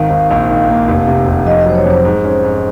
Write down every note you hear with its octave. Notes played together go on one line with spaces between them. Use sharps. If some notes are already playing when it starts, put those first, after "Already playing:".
Already playing: G#1 D#3 D#4 F5
G#1
A#1 F5
D#3
A#3
F1
C3
F1
F2 D#5
D#5
F#3 C5
C#5
F2 C5
G#2
C#4
G#2